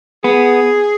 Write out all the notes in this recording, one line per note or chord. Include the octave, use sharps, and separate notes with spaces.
B3 G#4